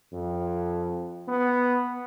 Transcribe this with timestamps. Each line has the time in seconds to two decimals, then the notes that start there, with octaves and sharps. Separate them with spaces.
0.13 F2
1.28 B3